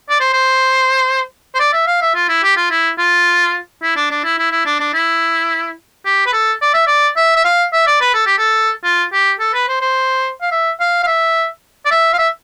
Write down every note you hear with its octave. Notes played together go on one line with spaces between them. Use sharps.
D5
C5
C5
C5
D5
E5
F5
E5
F4
E4
G4
F4
E4
F4
E4
D4
D4
E4
E4
E4
D4
D4
E4
G4
B4
A4
D5
E5
D5
E5
E5
F5
E5
D5
B4
A4
G4
A4
F4
G4
A4
B4
C5
C5
F5
E5
F5
F5
E5
D5
E5
F5
E5